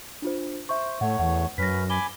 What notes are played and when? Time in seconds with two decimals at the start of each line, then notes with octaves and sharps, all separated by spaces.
0.22 D4 F4 C5
0.69 C5 E5 C#6
1.01 A2 A3 C#5 F#5
1.19 E2 F#5
1.58 F#2 C#4 B4 A#6 B6
1.90 G#5 B5 D6 G7